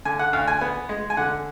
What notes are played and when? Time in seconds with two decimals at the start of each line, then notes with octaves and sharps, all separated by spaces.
0.05 D3 G#5
0.19 F#5
0.33 D2 F5
0.48 G#5
0.61 B3
0.89 G#3
1.10 G#5
1.17 D3 F#5